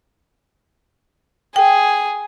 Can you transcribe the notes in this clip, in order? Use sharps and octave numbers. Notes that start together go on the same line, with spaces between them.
G#4 G5